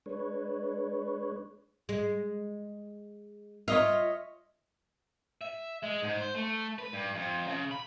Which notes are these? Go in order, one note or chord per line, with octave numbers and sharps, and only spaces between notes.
G#3 D4 B4 C#5
G#3
F4 C#5 D#5 E5
E5
G#3
G#2
C5
A3
B4
G2
F2
C#3
B5